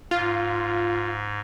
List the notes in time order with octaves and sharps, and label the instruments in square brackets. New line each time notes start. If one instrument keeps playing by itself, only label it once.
[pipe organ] G#2 [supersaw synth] F4